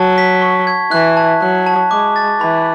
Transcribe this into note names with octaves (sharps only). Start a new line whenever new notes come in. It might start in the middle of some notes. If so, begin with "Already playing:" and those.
Already playing: F#3 A5
B6
C#6
G#6
E3 F#6
A5
F#3 F#6
A5
G#3 D6
A6
E3 B5